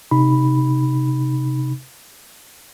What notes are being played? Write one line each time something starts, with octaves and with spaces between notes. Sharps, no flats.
C3 D#4 B5